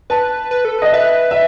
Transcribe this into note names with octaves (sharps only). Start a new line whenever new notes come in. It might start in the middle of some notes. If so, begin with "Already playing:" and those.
B4 A5
B4
A4
B4 D#5
B4 E5
E5